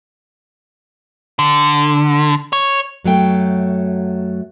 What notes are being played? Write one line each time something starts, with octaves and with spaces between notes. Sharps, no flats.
D3
C#5
F#2 F#3 A3 G5